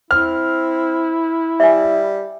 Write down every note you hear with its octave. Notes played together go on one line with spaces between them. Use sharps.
C4 E4 F6
G3 E5 G#5